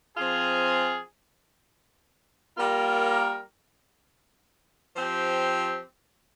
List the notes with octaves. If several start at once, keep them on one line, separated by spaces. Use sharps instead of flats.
F3 C4 F4 G#4
G3 A#3 F4 A#4
F3 C4 G4